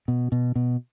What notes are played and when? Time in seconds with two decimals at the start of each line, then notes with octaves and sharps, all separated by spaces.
0.08 B2
0.32 B2
0.56 B2